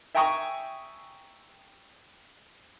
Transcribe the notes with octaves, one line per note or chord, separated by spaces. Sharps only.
E5 G5 G#5 A#5 C#6 D#6